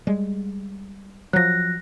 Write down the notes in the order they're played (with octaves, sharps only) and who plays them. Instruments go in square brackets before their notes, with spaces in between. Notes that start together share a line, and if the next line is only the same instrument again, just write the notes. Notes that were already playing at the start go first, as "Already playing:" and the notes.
[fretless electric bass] G3 G#3
[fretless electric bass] F3 F#3 [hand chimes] F#6 A#6